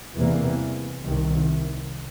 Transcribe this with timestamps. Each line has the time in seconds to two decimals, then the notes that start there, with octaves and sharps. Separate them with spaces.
0.16 E2 C3 E3 G3 A#3
1.04 C2 C3 D#3